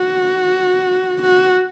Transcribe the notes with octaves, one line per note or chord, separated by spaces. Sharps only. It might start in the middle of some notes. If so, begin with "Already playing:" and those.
Already playing: F#4
F#4